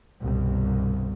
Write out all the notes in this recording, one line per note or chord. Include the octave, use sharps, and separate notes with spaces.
G1 C2 B2